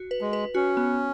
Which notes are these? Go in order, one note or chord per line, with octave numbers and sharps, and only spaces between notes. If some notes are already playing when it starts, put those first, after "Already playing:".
Already playing: F#4
B4
G#3
B4
C#4 F#4
B3